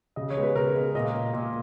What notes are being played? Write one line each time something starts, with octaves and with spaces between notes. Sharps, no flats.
C#3 D#5
C#5
G#3 B3
B4
C#3 A#4
G#3 B3
A#2 D#5
A#3
A#2